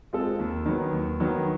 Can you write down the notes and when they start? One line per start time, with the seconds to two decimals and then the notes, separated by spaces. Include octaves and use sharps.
0.13 G#3 C4 F4 A4
0.39 D#2
0.66 D#3 F#3 B3
0.93 D#2
1.20 D#3 F#3 B3